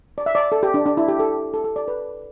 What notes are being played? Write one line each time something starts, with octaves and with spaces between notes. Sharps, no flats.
D5
E5
D5
A4
G4
D4
D4
E4
G4
A4
A4
A4
D5
B4